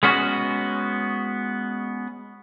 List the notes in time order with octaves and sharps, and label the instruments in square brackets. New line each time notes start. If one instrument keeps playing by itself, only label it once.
[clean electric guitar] G#3 B3 C#4 F#4